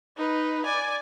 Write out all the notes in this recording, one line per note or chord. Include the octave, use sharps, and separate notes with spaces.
D#4 B4
D5 G#5